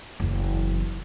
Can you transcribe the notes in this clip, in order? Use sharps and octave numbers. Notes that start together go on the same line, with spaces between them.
F#1 E2